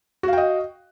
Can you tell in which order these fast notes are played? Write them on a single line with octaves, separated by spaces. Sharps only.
F#4 F5 G5 D#5